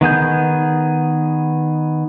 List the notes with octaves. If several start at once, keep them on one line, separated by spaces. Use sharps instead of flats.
D#3 B3 G#4 G6